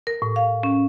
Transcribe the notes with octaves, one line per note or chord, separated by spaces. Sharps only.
A#4
A2
F5
C#4